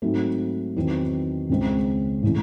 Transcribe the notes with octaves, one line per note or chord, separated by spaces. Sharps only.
G#2 F#3 A3 C4
E2 D#3 F#3 C4 D#4
C#2 C#3 G#3 C4
A2 E3 G#3 C#4 E4